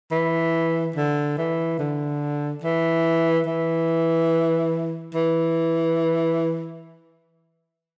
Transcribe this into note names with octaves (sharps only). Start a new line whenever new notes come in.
E3
D3
E3
D3
E3
E3
E3